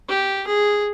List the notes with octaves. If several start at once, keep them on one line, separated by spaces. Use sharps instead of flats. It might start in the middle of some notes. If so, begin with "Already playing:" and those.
G4
G#4